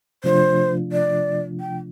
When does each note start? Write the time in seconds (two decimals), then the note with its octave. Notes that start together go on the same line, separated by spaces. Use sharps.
0.24 C3 F3 A3 D4 F4 C5
0.92 D5
1.60 G5